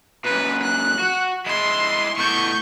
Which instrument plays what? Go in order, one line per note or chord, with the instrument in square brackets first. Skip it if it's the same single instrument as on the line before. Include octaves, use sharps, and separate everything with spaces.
[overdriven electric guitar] F#2 A#2 [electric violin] B4
[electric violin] F#6
[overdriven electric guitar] F#4
[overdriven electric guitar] G#3 E4 [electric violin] C6
[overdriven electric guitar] A2 B3 [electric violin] C#6 G6